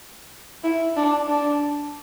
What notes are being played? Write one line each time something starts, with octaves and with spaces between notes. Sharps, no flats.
E4
D4
D4